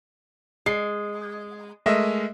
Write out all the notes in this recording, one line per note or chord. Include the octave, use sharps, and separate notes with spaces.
G#3 C7
G#3 A3 A#4 D#5 E5